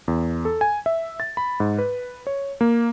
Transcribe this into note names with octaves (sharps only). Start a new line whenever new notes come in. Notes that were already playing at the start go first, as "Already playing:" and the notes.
E2
A4
G#5
E5
A6
B5
G#2
B4
C#5
A#3